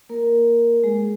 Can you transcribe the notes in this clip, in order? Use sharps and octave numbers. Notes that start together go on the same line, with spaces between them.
A#3 A#4
G#3 G#4